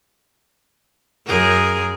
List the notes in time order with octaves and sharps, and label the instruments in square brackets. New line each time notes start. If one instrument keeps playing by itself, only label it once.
[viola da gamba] F#2 G#4 A#4